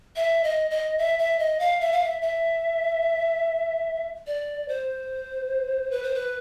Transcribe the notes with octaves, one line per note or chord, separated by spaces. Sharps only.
E5
D#5
D#5
E5
E5
D#5
F5
E5
F5
E5
E5
D5
C5
B4
C5
B4